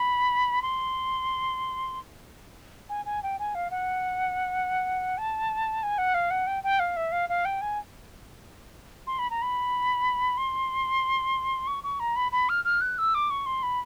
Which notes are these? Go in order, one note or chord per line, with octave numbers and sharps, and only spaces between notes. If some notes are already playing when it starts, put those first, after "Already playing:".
Already playing: B5
C6
G#5
G#5
G5
G#5
F5
F#5
A5
G#5
F#5
F5
F#5
G5
G5
F5
E5
F5
F5
G5
G#5
C6
B5
A#5
B5
C6
C#6
C#6
A#5
B5
B5
F6
F6
F#6
E6
D6
C#6
C6
B5